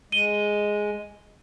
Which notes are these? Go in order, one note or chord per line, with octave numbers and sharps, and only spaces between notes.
G#3 D#7 G7